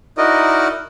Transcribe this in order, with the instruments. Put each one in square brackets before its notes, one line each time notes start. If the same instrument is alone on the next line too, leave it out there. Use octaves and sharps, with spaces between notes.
[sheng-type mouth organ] D#4 E4 F#4 A#4 D5 D#5